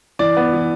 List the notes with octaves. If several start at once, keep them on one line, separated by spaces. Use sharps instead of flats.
E3 D5
B3
E3